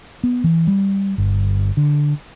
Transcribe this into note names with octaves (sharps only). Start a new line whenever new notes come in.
B3
E3
G3
G1
D3